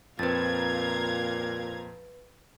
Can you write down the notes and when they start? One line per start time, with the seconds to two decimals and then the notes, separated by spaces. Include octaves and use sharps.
0.19 F2 A#2 C4 B4 F5 A#5 G#6 A6